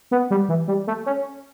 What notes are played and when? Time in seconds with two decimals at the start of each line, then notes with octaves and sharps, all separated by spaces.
0.11 B3
0.31 G3
0.49 E3
0.68 G3
0.87 A3
1.06 C#4